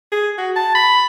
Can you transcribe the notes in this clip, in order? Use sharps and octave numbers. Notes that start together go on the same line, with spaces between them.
G#4
F#4
A5
B5